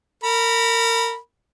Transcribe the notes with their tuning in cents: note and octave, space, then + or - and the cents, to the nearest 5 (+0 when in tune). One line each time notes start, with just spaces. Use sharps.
A#4 -25 B5 -20